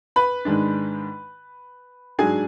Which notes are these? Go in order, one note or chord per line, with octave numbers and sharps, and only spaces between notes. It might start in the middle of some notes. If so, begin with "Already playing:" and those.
B4 B5
G#2 D#3 G#3 D4
G#2 F#3 D4 G#4 G#5